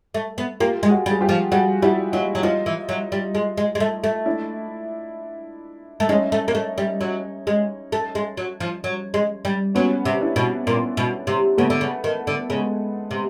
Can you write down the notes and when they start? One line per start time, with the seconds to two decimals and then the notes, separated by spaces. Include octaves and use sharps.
0.14 A3
0.38 B3
0.60 A#3 F4 G4
0.83 G#3
0.90 F#4 G#4
1.06 G3
1.11 G#4
1.21 F4 G4
1.29 F3
1.52 G3 F#4 G#4
1.82 G3 E4 F#4
2.12 F#3 D#4 F4
2.35 F#3
2.43 F3 D#4 F4
2.66 E3
2.89 F#3
3.12 G3
3.35 G#3
3.57 G#3
3.75 G#3
3.80 A3
4.04 A3
4.26 D4 E4
6.00 A3
6.09 G#3 C#4 D#4
6.32 A3
6.48 A#3
6.55 A3
6.78 G3
7.01 F#3
7.47 G#3
7.92 A3
8.15 G#3
8.37 F#3
8.60 F3
8.84 F#3
9.14 G#3
9.45 G3
9.75 F#3 B3 C#4
10.05 C3
10.21 D4 E4
10.36 B2
10.67 A#2
10.97 B2
11.27 C3
11.58 C#3 A3 B3
11.70 D3
11.81 C#3
12.04 D#3
12.27 D3
12.50 C#3 G#3
13.11 C3